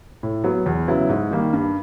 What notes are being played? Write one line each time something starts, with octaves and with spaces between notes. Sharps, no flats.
A2
F#3 B3
E2
C#3 F#3 B3 E4
G#2
D#3 G3 A#3
G2